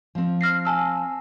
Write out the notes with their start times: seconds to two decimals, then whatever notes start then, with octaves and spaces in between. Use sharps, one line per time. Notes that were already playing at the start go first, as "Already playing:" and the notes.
0.15 F3 C4
0.41 F6 A#6 C7
0.65 G#5 A5 E6